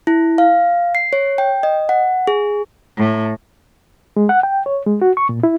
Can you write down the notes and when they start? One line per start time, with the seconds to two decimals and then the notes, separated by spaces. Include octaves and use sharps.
0.07 E4
0.38 F5
0.95 C7
1.13 C#5
1.38 G5
1.63 D#5
1.89 F#5
2.27 G#4
2.98 A2
4.17 G#3
4.29 F#5
4.43 G5
4.66 C#5
4.87 G#3
5.02 F#4
5.17 C#6
5.29 A#2
5.43 E4